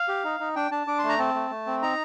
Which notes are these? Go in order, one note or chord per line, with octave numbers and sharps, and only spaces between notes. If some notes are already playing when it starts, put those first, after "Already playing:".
Already playing: F5
G4
D#4
D#4
D4 G5
D4 A5
D4 D6
C6
A3
A#5
C4 A5
A3
A3
C4
D#4 A#5